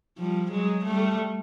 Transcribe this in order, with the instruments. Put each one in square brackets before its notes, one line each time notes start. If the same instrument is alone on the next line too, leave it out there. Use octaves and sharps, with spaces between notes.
[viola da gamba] F3 G3
F#3 G#3
G3 A3